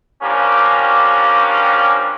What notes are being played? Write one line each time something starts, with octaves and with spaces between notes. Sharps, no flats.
F3 G3 A#3 C#4 D4 G4